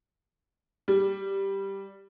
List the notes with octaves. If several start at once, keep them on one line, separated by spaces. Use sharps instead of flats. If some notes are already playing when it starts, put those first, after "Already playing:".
G3